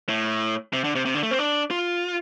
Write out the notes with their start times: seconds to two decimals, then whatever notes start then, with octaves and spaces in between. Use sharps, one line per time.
0.09 A2
0.73 C3
0.84 D3
0.95 C3
1.05 C3
1.15 D3
1.23 A3
1.31 C4
1.39 D4
1.71 F4